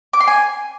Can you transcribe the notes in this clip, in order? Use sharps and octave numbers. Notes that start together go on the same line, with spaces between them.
D6
C6
G#5